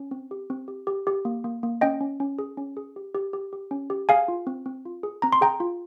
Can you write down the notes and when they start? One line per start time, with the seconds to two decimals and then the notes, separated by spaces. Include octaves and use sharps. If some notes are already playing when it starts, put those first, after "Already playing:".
Already playing: C#4
0.11 C4
0.31 G4
0.50 C4
0.68 G4
0.87 G4
1.07 G4
1.25 A#3
1.44 A#3
1.63 A#3
1.81 C#4 D#5 G5
2.01 C#4
2.20 C#4
2.39 G#4
2.57 C#4
2.77 G#4
2.96 G4
3.15 G4
3.33 G4
3.53 G4
3.71 C#4
3.90 G4
4.09 G#4 F5 G#5
4.28 F4
4.47 C4
4.66 C4
4.85 F4
5.03 G#4
5.22 C4 A#5
5.33 C6
5.41 G#4 G5 A#5
5.60 F4